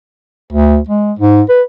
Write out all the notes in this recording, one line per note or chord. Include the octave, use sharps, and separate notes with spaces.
D2
G#3
G#2
B4